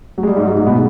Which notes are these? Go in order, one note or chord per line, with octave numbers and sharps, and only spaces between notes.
F#3
G#3
G3
G#2 G#3
F#3
G#2 G#3
B2 B3